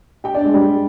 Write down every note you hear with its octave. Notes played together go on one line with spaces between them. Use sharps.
G4 G5
D4 D5
G#3 G#4
G3 G4